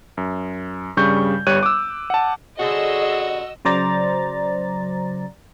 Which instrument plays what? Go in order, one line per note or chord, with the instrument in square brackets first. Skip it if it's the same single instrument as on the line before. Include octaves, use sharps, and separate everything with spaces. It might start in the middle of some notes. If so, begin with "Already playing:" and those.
[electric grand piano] F#2
G2 C#3 G3 C#6 G6
G1 G3 C#5 F#6 D#7
D6 E6
F#5 A5
[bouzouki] D3 G3 C#4 [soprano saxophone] F#4 [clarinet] G#4 [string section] D#5 E6
[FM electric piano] C#3 F#3 C5 D5 A#5 A6